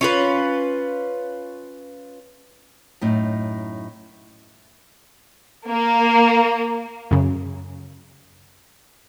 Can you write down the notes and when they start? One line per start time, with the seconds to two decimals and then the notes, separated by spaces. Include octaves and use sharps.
0.01 C#4 F4 B4
3.01 F#2 A2 D#4
5.70 A#3
7.11 F#2 C#3